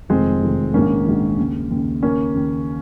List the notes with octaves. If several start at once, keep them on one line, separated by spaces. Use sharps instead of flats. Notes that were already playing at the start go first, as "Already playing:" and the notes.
F1 F2 C3 D#3 G#3 C4
F1 F2 C3 D#3
A#1 G#2 D#3 A#3 C#4
A#1 G#2 D#3
D#2 C#3
D#2 C#3
D#2 C#3 A#3 C#4
D#2 C#3